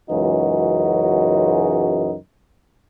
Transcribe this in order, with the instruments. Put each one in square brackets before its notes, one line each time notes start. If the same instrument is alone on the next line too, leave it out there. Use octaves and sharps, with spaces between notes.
[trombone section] C#2 F#2 E3 G#3 D#4 F#4